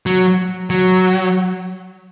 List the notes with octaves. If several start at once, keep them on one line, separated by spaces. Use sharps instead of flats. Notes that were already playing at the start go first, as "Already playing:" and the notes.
F#3
F#3